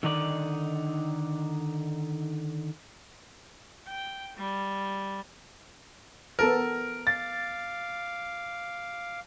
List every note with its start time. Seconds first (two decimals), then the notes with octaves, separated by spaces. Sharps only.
0.03 D3 D#3 D#4 D5
3.87 G5
4.38 G3
6.39 B3 A4 A#4 A5
7.07 F5 D6 A6